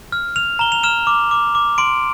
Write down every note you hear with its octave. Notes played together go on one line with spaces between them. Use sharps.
F6
F6 F7
A#5 G7
F7
F6 E7
D6
D6
D6
C6 D7